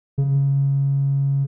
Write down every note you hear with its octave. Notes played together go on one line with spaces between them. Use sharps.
C#3